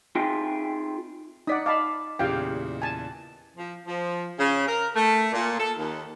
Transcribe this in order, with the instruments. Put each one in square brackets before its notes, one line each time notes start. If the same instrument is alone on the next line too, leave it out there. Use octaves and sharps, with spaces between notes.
[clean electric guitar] C4 D#4 F4 G#4 E5 G5
[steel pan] D#4 D5 F#5 [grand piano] D#6 B6
[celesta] D#5 D6 [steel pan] F5 A5 B5
[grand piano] E2 A#2 C#3 [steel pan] G4 F5 G5
[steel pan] G#5 A5
[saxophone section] F3
F3
C#3
A#4
A3
A#2
A4
D#2